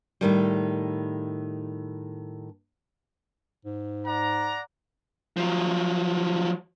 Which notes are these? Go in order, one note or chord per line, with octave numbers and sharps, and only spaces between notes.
A2 D#3 G3
G#2
D5 F#5 A#5
F3 F#3